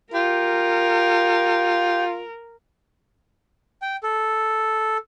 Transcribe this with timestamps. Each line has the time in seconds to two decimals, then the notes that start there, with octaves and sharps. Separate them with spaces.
0.14 F4 G4 A#4
3.82 G5
4.03 A4